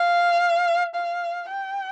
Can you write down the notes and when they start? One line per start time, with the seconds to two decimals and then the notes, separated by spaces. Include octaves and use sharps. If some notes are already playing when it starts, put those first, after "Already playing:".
Already playing: F5
0.95 F5
1.50 G5